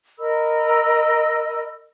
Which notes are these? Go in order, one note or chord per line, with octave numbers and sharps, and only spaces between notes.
A#4 D#5 B5 E6